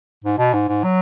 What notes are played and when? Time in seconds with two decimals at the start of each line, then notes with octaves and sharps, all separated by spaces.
0.24 G#2
0.38 B2
0.53 G#2
0.68 G#2
0.84 F#3